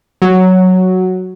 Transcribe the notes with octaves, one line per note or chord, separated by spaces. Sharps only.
F#3